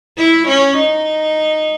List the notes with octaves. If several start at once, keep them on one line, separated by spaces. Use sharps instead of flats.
E4
C#4
D#4